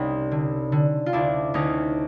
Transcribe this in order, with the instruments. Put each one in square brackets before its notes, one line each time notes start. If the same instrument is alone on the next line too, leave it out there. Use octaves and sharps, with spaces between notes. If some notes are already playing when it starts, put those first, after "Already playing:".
Already playing: [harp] C2 C#4 D#4
D3
D3
F4
D2 D4 E4
D2 C#4 D#4